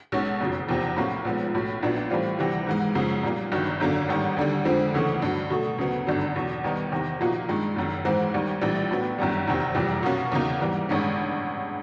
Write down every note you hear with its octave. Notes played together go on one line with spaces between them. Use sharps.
B1 B2 G#3 C#4
F#1 F2 C#3 F#3
F1 E2 C3 F3
A2 F#3 A#3 C#4 F#4
B1 A#2 F3 G#3 B3
B1 A2 F#3
A#1 A#2 F#3 B3 D4
A2 E3 G3 C4 F4
D2 C3 E3 G3
G#2 E3 G#3
F#2 C#3 F3 G#3
A#2 G3 A#3
G1 G2 D#3 F#3
G#1 F#2 D3 F#3 A#3
A1 G#2 D#3 G3
D#2 D3 G3
F2 D3 F3 G#3 C4
D2 C#3 E3 A3 C#4
G2 D3 F#3
B2 F#3 A3
D2 C#3 F#3 B3
G#1 G2 D3 F#3
E2 B2 F#3
D#2 D#3 G3 B3 D#4
E2 C3 D#3
A#2 F3 A#3 D#4 F#4
G2 D#3 G#3
F#1 F#2 D#3
G#2 E3 G#3 C4
D#2 D#3 G3
A#1 A2 E3 G3
A2 F#3 B3
G1 F#2 D#3 G3
F1 E2 C3 D#3
F#1 F2 C3 E3 G3
B2 F#3 A#3 C#4 F#4
E2 C#3 F#3 A#3 D#4
G#2 E3 G3
A1 G2 D#3 G#3 C#4